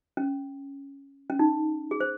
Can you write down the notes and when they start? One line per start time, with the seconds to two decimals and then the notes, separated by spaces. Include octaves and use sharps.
0.17 C#4
1.30 C#4
1.39 D#4
1.91 G#4
2.00 C5